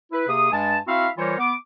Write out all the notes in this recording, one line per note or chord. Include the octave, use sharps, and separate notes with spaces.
E4 B4
C3 A#3 G#4 D#6
G2 G#3 G#5 A5
C4 E4 F#4 E5 F5
E3 G3 F4 A#4 C5 C#5
B3 D6